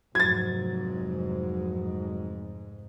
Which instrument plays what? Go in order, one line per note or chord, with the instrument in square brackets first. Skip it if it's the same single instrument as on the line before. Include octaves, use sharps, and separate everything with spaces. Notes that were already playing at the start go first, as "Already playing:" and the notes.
[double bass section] F1 G#2 [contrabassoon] F#3 [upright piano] G#6 A6